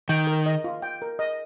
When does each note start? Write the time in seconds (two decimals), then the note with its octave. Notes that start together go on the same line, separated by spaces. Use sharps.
0.09 D#3 G5
0.27 A#4
0.46 D#5
0.64 F4
0.82 G5
1.02 A#4
1.19 D#5